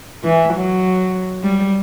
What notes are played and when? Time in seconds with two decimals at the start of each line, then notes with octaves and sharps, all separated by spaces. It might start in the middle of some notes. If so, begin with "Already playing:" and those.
0.24 E3
0.54 F#3
1.43 G3